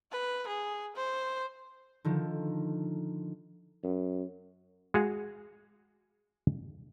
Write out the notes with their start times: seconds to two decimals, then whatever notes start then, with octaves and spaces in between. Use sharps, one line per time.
0.12 B4
0.48 G#4
0.97 C5
2.05 D3 D#3 F3
3.83 F#2
4.94 G#3 F#4 G#4 F5